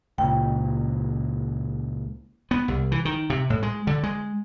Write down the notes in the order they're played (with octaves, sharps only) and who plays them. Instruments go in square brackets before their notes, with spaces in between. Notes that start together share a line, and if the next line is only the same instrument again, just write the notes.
[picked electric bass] C#2 A#2 [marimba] G5
[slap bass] B3
C2
E3
D#3
C3
A2
G#3
D3
G#3